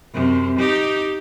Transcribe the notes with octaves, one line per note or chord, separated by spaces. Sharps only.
F#2 C3
D#4 G4